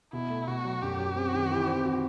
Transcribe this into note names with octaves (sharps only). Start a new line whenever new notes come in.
B2 E4
A3
B2 F#4
F#3
F#2 G4
F#3
C4
D#3
E3
C4
F#4